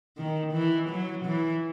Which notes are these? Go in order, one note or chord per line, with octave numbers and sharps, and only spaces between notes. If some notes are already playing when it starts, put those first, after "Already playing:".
D#3
E3
F#3
E3